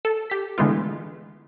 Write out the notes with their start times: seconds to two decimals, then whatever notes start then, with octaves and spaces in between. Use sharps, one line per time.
0.05 A4
0.30 G4 B6
0.58 D3 E3 G#3 A3 B3 F4